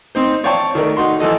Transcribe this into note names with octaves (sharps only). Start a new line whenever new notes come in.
C4 D#4 C5
C#5 D5 F5 G5 A5 C#6
D#3 A3 A#4 D5
D#4 F#4 C6
G#1 E3 A4 D#5